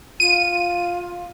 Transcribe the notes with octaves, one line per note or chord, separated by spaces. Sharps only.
F4 D#7